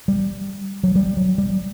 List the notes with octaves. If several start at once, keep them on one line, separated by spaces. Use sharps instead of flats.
G3
F#3
G3
F#3
G3